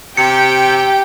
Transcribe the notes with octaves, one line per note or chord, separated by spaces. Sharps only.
C3 G4 G5 C#7